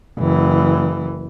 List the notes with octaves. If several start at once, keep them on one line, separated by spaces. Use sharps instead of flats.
F#1 E3